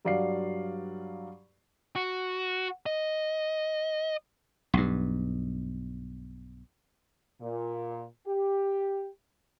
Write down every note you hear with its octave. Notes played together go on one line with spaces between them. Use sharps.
G2 F#3 D5 F5 C7
F#4
D#5
B1 G2
A#2
G4